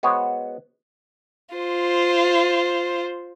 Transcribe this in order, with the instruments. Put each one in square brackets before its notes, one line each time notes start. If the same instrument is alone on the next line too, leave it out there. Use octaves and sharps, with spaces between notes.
[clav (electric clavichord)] G#3 B3 F#4 C5 C#5
[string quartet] F4 C5